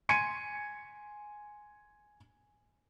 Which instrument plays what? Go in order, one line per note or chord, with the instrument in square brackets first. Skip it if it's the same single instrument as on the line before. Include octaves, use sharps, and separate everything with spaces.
[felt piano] G#5 C6 G#6 C#7 D#7